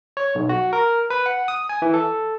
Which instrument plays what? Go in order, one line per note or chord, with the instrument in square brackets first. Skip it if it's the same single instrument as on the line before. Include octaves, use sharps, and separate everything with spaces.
[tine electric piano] C#5
B1
F#4
A#4
B4
F#5
D#6
G#5
E3
A4